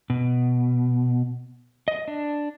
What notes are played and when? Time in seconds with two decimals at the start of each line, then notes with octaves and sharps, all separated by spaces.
0.10 B2
1.88 D#5
2.08 D4